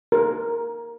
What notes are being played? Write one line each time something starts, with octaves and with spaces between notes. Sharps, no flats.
A#4